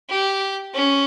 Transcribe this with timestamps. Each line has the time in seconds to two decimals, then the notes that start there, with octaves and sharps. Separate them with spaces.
0.09 G4
0.74 C#4